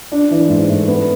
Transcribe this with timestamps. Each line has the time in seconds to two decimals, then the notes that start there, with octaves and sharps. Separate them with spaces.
0.12 D4
0.31 E3
0.49 G#2
0.69 A3
0.88 B3